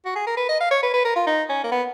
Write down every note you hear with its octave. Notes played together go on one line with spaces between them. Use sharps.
F#4
G#4
A#4
B4
D#5
F5
C#5
B4
B4
A#4
F4
D#4
C#4
A#3
B3